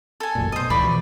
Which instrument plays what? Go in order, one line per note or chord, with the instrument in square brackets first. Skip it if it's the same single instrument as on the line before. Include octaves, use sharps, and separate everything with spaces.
[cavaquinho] A4 G#5
[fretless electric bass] A1 F#2 A#2
[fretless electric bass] B2 [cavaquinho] C5 D#5
[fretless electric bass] C#2 A2 E3 [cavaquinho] D5 B5 C#6
[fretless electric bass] B2 E3 F3